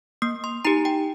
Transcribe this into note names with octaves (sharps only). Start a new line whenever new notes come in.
A#3 D#6
C6
D#4 G4 A#5
G5